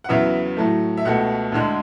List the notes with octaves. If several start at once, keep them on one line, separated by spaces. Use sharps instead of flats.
F#5
E2 C#3 F#3 B3 E5
A2 F#3 A3
E5
C#2 B2 A3 F#5
D2 D3 G#3